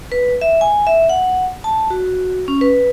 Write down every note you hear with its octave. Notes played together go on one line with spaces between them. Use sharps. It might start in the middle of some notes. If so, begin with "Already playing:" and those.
B4
E5
G#5
E5
F#5
A5
F#4
C#4
B4